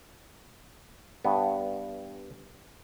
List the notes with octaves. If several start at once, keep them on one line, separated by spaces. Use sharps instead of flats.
G2 B3